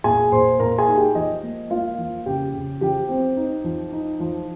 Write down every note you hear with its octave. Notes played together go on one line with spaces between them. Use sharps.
A#2 G#4 G#5
A#2 C5 C6
A#2 A#4 A#5
G#4 G#5
D#4
G4 G5
F3 D#5
A#3
A#3 F4 F5
F3
C#3 G4 G5
C#3
F3 G4 G5
C4
D#4
F3
D#4
F3